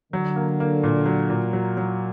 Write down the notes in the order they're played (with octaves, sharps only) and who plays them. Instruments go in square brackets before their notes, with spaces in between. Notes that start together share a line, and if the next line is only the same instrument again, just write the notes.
[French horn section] D3 [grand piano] F#3
[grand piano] A#3
A#3
A#2
F#3
A#2
F#3
F#3